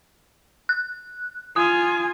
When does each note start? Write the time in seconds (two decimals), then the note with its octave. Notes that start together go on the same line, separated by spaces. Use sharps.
0.69 F#6
1.56 F4 G#5 D#6